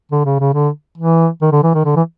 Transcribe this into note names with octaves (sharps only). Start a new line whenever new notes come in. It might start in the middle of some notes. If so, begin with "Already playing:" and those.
D3
C#3
C#3
D3
E3
D#3
D3
E3
D#3
D3
E3